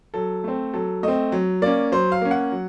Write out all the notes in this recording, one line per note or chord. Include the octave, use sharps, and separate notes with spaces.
F#3 A4
A3 C4
F#3 A4
A3 C4 D#5
F#3
A#3 C#4 D5
F#3 C5
F5
A#3 C#4
F#5
F#3